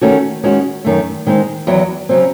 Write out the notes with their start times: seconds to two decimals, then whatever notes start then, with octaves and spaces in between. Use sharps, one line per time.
0.01 D#3 A3 C#4 F#4
0.44 D#3 G#3 C#4 F#4
0.84 F#2 D#3 A3
1.27 D#3 G#3 C4 D#4
1.67 E2 D#3 F#3
2.09 C#3 F#3 C4